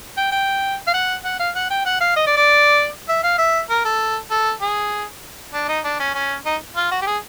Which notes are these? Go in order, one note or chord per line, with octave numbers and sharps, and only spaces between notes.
G5
G5
F5
F#5
F#5
F5
F#5
G5
F#5
F5
D#5
D5
D5
E5
F5
E5
A#4
A4
A4
G#4
D4
D#4
D4
C#4
C#4
D#4
F4
F#4
G4
G#4